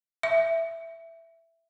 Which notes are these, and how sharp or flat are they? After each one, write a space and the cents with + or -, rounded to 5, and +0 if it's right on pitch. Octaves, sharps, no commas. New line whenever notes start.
E5 +5